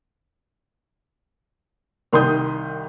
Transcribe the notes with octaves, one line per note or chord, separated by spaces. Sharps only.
C2 D#3 C6 D#6 G6